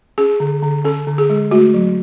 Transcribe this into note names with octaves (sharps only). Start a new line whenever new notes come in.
C#4 G#4
D3
D3
C#4 A4
D3
G#4
G#3
A3 F#4
F#3